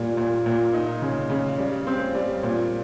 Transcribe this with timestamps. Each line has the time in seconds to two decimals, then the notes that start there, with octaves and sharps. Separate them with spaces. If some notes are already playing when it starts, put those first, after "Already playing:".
Already playing: A#2 G3
0.17 A#2
0.46 A#2
0.73 D#4
1.02 C#3
1.30 C#3
1.58 G3
1.87 C4
2.15 G3
2.43 A#2